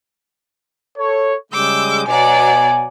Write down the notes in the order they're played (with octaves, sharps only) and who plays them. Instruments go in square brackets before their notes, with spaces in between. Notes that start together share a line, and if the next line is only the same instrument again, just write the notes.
[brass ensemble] A4 C#5
[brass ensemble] C#3 G3 G#3 [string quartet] D6 E6 G6
[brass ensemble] B2 G#5 [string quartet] F#3 D5 F#5